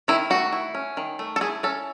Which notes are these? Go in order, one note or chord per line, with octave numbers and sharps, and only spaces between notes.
D#3 E4
A3 F#4
E4
C#4
D#3
A3
A4
E4 G#4
C#4 A4